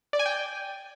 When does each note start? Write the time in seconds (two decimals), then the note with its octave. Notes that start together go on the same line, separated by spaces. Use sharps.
0.13 D5
0.19 G#5
0.26 G5